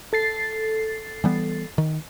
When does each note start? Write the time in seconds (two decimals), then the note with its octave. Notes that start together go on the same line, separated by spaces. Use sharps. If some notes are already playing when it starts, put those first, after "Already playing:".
0.13 A4 A6 C7
1.24 E3 G3 B3
1.78 D#3